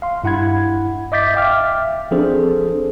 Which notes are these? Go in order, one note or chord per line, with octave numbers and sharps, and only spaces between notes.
F5 C6
G2 E4 F#5 B5 G#6
D#5 E5 D6 G6 A6 B6
E5 F5 G5 D6 F6
F3 C4 D4 G#4 A4 C5